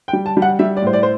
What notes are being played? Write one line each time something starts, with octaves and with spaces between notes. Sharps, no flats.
G5
G3
A5
G3
F#5
G3 E5
D5
A2 C5
D5
C5